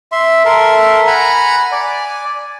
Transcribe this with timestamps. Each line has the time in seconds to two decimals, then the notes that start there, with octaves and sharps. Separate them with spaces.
0.12 E5 C6
0.45 A4 A#4 E5 C6
1.07 F#5 G#5 A#5 B5
1.72 D5 G#5